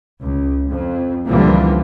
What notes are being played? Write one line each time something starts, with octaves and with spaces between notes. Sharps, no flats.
C#2
F2
C#2 A#2 D3 E3 F3 G3